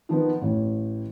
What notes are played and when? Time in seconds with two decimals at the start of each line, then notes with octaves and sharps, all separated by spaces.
0.09 D#3 F3 B3
0.42 A1